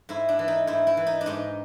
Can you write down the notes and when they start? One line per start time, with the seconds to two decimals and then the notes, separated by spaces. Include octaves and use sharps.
0.09 G#2 E4
0.29 D4
0.39 E3
0.48 D#4
0.67 G#2 E4
0.87 E4
0.97 E3
1.07 D#4
1.21 D4
1.26 G#2 D#4